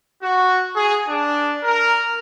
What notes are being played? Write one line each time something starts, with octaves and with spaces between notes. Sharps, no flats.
F#4
G#4
D4
A#4